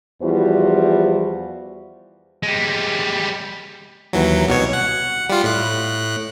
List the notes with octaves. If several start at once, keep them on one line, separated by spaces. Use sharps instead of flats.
E2 F3 G3 E4 F#4 C5
G3 G#3
D#2 E3 F#3
C2 B2 C#5
F#5
G3 F4
A2 F#6